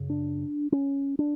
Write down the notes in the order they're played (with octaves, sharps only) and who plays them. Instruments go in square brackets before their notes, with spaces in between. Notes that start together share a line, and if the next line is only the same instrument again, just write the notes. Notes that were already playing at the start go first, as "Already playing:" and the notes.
Already playing: [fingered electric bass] F#2 C#3
D4
C#4
D4